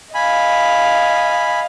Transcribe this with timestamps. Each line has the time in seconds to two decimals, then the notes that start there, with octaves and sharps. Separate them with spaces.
0.15 D#5 F5 G#5 B5